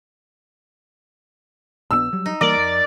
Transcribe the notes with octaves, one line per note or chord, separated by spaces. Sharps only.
A#1 E3 B3 E6
F#3 G3
D#4
E3 G3 A#3 A#4 D5
F2